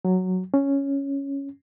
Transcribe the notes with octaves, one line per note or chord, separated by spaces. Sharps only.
F#3
C#4